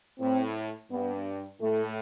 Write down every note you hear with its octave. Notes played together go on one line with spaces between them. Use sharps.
A2 C4
G2 B3
A2 A3